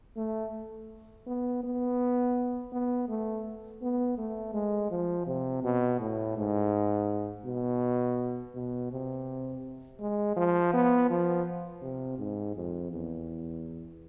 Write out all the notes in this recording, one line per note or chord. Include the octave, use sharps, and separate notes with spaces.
A3
B3
B3
B3
A3
B3
A3
G#3
F3
C3
B2
A2
G#2
B2
B2
C3
G#3
F3
B3
F3
C3
G#2
F2
E2